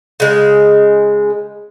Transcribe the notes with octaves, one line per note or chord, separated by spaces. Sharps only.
C#3 G#3